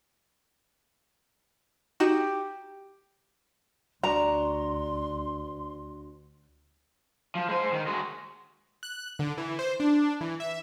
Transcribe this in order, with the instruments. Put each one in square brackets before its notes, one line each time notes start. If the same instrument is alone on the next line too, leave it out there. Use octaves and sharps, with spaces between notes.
[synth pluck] D#4 F#4 E7 [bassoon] G4
[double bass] D2 [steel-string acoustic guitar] D4 F#4 C#5 [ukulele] A#5 [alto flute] C6
[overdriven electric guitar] F3
G#3 C5
D#3
G#3 F#4
[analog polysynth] F#6
D3
E3
C5
D4
E3
E5